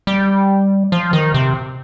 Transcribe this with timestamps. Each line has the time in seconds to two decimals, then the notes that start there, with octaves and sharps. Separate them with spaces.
0.07 G3
0.92 F3
1.13 D#3
1.34 C3